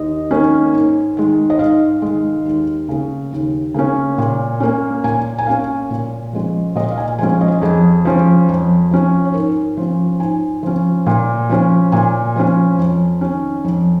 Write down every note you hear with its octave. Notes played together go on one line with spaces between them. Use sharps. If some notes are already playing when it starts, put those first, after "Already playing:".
Already playing: D#2 D#5
D#3 A#3 C#4
G#2
D#3 G#3
D#5
G#2 F5
D#3 G#3
D#2
C#3 A#3 C#4
D#2
C#3 A#3 C#4
A#2
A#3 C#4
A#2 G#5
G#5
A#3 C#4 F5
A#2
F3 G#3 C#4
A#2 D#5
F5
G#5
F3 G#3 C#4 G#5
D#5
F2 G#4
F3 C#4
F2
F3 C#4
C#5
G#2 A#4
F3 C#4
G#2 G#5
F3 C#4
A#2
F3 C#4
A#2 G#5
F3 C#4
F2
D#3 C#4
F2